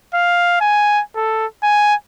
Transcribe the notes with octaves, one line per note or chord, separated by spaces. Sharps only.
F5
G#5
A4
G#5